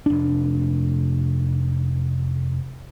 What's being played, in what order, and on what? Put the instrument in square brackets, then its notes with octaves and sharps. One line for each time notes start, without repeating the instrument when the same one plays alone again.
[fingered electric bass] F1 D4